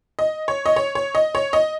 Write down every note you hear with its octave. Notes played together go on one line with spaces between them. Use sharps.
D#5
C#5
D#5
C#5
C#5
D#5
C#5
D#5